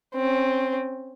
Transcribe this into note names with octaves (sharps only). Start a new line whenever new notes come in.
C4 C#4